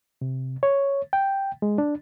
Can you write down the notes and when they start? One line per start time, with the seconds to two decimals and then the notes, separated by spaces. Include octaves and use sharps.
0.21 C3
0.63 C#5
1.13 G5
1.62 G#3
1.78 D4